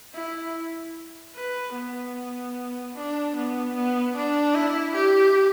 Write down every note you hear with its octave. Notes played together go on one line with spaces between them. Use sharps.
E4
B4
B3
D4
B3
B3
D4
E4
G4